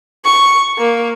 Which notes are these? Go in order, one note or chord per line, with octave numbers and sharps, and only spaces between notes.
C#6
A#3